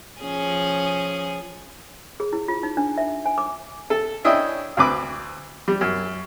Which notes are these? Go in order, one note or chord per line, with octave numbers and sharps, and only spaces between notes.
F3 C#4 G#4
G#4
E4
F4
D#4
D4
E5
G#5
D6
A4
C#4 D4 E4 D#5 G5
D2 C4 B4 D6
G3
F#2